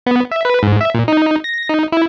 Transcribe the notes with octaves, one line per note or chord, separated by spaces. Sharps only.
B3
E5
B4
G#2
E5
A#2
D#4
A#6
D#4
E4